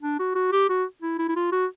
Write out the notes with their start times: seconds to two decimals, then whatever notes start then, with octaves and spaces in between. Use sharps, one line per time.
0.02 D4
0.19 F#4
0.35 F#4
0.52 G4
0.69 F#4
1.02 E4
1.19 E4
1.29 E4
1.36 F4
1.52 F#4